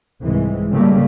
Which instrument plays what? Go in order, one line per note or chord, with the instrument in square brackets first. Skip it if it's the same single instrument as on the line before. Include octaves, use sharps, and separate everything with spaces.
[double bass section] C2 G#2 E3 G#3
C#3 G3 A3 A#3